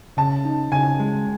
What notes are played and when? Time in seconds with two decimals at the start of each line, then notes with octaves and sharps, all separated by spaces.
0.17 C#3 A5
0.45 D#4
0.72 C#3 G#5
0.99 G#3